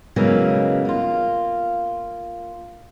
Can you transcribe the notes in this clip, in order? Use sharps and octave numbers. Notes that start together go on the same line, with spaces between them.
C#3 E3 F#3 G#3 A#3 B3
A#3 F4